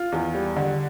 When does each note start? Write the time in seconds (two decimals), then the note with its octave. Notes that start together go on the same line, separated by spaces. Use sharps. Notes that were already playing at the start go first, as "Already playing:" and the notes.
Already playing: F4
0.12 E2
0.34 G3
0.56 D3